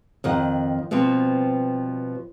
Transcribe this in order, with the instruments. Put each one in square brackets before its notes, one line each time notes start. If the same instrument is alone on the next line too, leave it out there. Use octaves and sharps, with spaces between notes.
[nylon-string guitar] F2 D#3 F#5
B2 F3 G3 C4